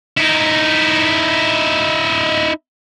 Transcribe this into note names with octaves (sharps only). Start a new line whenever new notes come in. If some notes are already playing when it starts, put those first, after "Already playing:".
D#4 E4